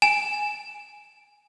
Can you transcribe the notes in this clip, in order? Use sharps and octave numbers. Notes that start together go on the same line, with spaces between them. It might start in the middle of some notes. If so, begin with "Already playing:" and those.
G#5 E7